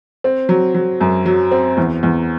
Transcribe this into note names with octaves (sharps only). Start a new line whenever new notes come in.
C4
F#3
F#3
F#2
F#3
C4
E2
E2